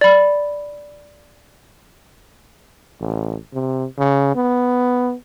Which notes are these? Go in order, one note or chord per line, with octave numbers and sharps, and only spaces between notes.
D5 B5
A1
C3
C#3
B3